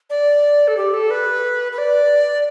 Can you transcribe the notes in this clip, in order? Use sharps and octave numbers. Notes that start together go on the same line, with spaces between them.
D5
A4
G4
A4
B4
B4
D5